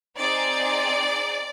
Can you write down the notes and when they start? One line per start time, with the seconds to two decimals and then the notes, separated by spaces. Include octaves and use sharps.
0.18 C4 D#4 G#4 D5